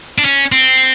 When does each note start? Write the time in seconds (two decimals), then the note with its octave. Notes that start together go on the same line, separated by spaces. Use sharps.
0.18 D4
0.25 C#4
0.52 C4